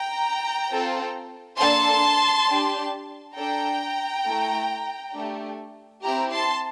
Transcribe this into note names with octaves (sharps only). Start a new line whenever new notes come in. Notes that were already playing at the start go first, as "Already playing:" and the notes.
Already playing: G5 A#5
C4 F4 A4
A#3 D4 A4 A5 C6
D4 G4
D4 A4 G5 A#5
A3 E4 A4
A3 D4 G4
C4 E4 G4 G5 A#5
A5 C6